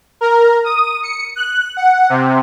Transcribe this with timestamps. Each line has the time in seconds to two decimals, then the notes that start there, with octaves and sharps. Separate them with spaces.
0.21 A#4
0.64 D#6
1.03 C#7
1.36 F#6
1.77 F#5
2.09 C3